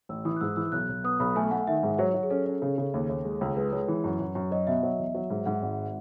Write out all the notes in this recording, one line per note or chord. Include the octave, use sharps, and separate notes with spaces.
A1 E6
E3 D#6
F#6
G#2 E6
E3 E6
B1 F#6
B1
B3 D#6
B1 B5
A3 G#5
A3 F#5
D#3 E5
G#2
F#3 C#5
F#3
G#4
C#4 A4
C#4
C#3
C#3
D#2
D#2
G#3
C#2
G#3 B4
G#3 C#5
E3
F#2
F#2
F#2
F#3 D#5
B2 E5
F#3
E2
F#3
G#2
G#2 F#5
G#1